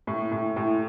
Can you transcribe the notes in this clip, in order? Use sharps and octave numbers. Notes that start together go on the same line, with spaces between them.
A2
A2
A2